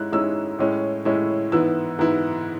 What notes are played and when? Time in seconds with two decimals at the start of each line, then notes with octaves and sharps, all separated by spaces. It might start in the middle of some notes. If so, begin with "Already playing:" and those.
Already playing: G#2 G#3 C#4 E4 F#6
0.12 G#2 G#3 C#4 E4 E6
0.59 A2 G#3 C#4 E4
1.05 A2 G#3 C#4 E4
1.52 G#2 E3 B3 E4 E6
1.99 G#2 E3 B3 E4